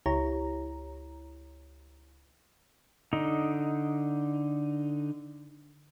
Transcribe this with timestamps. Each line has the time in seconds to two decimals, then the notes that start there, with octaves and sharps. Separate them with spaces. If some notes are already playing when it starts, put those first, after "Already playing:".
0.06 C#2 E4 G4 C#5 A#5
3.13 D3 D#4